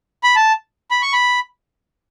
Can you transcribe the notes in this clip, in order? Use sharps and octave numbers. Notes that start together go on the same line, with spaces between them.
B5
A5
B5
C#6
B5